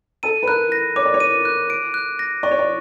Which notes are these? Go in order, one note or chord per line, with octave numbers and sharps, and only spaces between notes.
A4 D#7
B4
A#4 F#6
A#6
C#5 D6
D5
C#5
D#7
F#6
D7
F#6
A#6
D5 C#6
C#5
D5